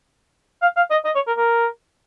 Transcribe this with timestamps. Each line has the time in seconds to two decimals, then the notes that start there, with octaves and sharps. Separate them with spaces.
0.62 F5
0.77 F5
0.91 D#5
1.05 D#5
1.15 C#5
1.27 A#4
1.37 A#4